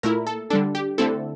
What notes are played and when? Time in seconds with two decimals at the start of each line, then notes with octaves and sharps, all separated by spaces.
0.03 A#2 A3 E4 A#4
0.27 A4
0.50 D3 G3 D4 A4
0.75 G4
0.98 D3 A3 C4 E4 A4